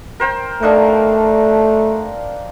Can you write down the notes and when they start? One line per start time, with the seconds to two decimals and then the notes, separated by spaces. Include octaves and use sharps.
0.20 A#4 C5 G5
0.63 A3 A#3 D4 D#4